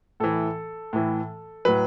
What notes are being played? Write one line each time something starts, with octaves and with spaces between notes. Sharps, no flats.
A2 E3 A4
A2 E3
A2 F#3 B4